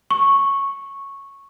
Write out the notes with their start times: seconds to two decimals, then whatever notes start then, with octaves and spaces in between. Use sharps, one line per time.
0.11 C#6